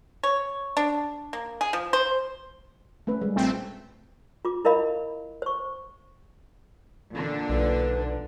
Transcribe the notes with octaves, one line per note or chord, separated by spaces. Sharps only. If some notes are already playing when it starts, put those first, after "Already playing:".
C#5
D4
A#3
G#4
F3
C5
A3 C#4 B4
G3 G#3
A#1 A3 C4
F4 D6
E4 A#4 D#5 F5 B5
C5 C#6
A#2 D3 D4
B1 B4